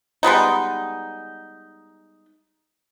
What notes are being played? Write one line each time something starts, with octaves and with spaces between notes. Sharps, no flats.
G3 G#3 B3 D#4